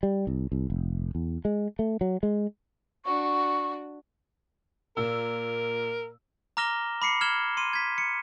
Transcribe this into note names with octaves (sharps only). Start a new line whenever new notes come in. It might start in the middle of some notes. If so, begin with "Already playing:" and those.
G3
C2
C2
F1
E2
G#3
A3
F#3
G#3
D4 F#4 C#6
A#2 A#4 E6
A#5 D6 F6 A#6 E7 G7
B5 D6 C7 C#7
F6 G#6 E7 G7
C6 D#7
G#6 B6
C#7